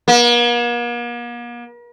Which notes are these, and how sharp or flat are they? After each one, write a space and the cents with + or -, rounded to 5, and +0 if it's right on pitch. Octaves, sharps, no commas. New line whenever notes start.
A#3 +45